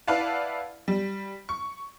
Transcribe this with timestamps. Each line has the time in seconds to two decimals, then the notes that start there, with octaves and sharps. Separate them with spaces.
0.08 E4 B4 D5 F5 F#5 A5
0.88 G3
1.49 C#6